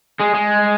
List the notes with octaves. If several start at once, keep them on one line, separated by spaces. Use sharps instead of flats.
G#3
G#3